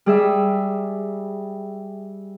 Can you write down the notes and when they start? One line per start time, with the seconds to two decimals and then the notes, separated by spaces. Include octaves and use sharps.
0.06 G3 G#4 E5